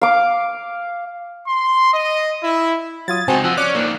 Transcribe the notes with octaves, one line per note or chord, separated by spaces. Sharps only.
F5 D6
C6
D#5
E4
F#3 F4 D#6 G#6 A6
C#2 C4 D#4 F#4 G#5 A5
F3 D#5 F#5 E6
C#4 C#5 D5 D6 F#6
D#3 F3 A#3